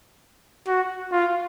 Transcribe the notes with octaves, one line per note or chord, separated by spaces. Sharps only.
F#4
F4